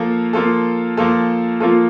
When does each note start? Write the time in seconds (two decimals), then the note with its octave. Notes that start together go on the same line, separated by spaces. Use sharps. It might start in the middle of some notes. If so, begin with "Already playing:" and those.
Already playing: F3 A#3 F4 A4
0.33 F3 A#3 F4 A4
0.97 F3 A#3 F4 A4
1.60 F3 A#3 F4 A4